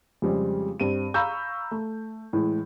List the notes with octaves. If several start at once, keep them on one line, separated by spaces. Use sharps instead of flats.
F2 C#3 G3 G#3 C4
G2 C4 D#7
F5 A#5 B5 C#6 E6 G6
A3
A2 E3 G#3